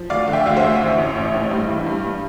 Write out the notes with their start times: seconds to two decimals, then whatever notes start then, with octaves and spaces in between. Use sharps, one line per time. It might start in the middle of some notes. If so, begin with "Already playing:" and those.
Already playing: F3
0.10 D2 D5 F5
0.27 D3
0.33 E5 G5
0.46 D2 F5
0.56 C5 E5
0.63 D2
0.80 A1
0.98 A1
1.16 A1
1.34 A2
1.51 G2
1.68 E3
1.87 G2